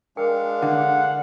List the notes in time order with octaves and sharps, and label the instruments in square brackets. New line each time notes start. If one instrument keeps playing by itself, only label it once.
[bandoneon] G#3 D4 F5 [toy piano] A#4 G5
[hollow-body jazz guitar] D3 [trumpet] F#5